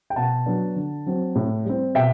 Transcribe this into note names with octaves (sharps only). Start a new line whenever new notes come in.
G5
B2 F#5 A5
F#3 B3 D4
D3
F#3 C4
A2
G3 C4
B2 E5 G5